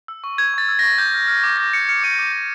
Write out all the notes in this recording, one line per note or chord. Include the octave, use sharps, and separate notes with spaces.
E6
C#6
G6 G#6
C#6 A6
E6
C#6 A#6
D6 G6
F6
F6
D6
D6 A#6
F6 C#7
F6 C#7
D6 D#7
D6
G6